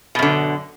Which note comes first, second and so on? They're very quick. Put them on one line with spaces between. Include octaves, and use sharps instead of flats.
B2 F#2 D3